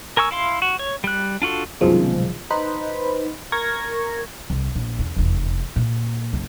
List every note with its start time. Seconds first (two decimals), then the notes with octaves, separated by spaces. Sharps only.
0.17 A#4 G#5 C#6 E6
0.31 E4 F5 C6
0.62 F#4
0.79 C#5
1.04 G3 F#6
1.42 D4 F4 F#4 A4
1.81 C2 F#2 B2 D#3 F3 G#3
2.50 D#4 B4 C5 B5
3.52 A#4 C#6 G#6 A#6
4.50 C2
4.75 A#1
4.99 E2 C#3
5.16 F1 E2
5.76 A#2
6.33 F#1 C#3